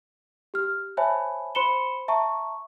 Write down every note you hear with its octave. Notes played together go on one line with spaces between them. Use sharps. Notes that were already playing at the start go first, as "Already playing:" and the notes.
G4 F6
C5 C#5 E5 G#5 A5 B5
C5 B5 C6 C#7 E7 G7
E5 A5 A#5 C#6